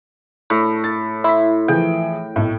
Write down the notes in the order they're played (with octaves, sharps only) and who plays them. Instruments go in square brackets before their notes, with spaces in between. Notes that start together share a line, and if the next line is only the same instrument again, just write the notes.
[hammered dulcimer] A2
[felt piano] A6
[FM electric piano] E4 [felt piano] C6 B6
[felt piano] E3 F3 G#4 [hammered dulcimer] G5
[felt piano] B1 A2